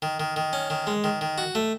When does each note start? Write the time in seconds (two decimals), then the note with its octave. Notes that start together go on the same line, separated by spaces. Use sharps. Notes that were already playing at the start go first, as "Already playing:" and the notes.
0.02 D#3
0.20 D#3
0.36 D#3
0.53 C#4
0.70 D#3
0.87 G#3
1.04 D#3
1.21 D#3
1.38 F#4
1.55 A3